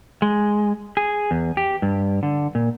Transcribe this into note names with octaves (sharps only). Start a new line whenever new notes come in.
G#3
G#4
E2
G4
G2
D3
A#2